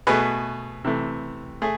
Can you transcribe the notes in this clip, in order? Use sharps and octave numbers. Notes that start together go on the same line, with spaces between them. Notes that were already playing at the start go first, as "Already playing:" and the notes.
B2 A3 G#4 B4
C3 E3 A3
A3 G#4